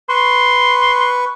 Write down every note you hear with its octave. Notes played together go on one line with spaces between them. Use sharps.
B4 C6 C#6